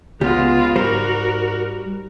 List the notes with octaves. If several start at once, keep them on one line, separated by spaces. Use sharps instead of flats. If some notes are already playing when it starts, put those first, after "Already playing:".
C#2 G#3 B3 F4 G4
G#2 G3 F#4 A#4 C5